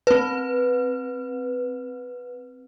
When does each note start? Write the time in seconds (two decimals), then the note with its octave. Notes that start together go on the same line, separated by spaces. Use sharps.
0.07 C4 B4